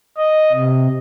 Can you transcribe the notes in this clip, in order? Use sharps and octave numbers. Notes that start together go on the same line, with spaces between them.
D#5
C3